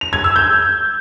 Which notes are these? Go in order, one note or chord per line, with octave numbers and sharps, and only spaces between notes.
F7
G#6
E6
G6